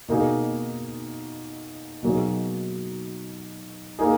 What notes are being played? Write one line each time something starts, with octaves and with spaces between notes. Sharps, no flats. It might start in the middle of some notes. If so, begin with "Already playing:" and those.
B2 A#3 D#4 G#4
B2 F#3 A#3 D#4 G#4
A#3 D#4 G#4